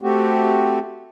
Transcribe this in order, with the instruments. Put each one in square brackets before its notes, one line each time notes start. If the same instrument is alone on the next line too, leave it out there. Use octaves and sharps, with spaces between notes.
[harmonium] A3 C4 F#4 G4